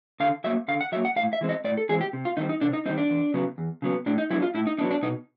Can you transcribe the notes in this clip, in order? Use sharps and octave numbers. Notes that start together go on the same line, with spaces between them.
D3 F5
F#3 A#3 E5
D3 F5
F#5
F#3 A#3 E5
F#5
A2 F5
E5
E3 G#3 C4
D#5
A2 D5
A4
E3 G#3 C4 G#4
G4
C3
F4
D#3 G3 C4 D#4
D#4
C3 D4
D#4
D#3 G3 C4 D#4
D4
E2
C#3 F#3 B3
E2
C#3 F#3 B3
A2 D4
D#4
F#3 B3 D4 E4
F4
A2 E4
D#4
F#3 B3 D4 D#4
D4
B2 D#4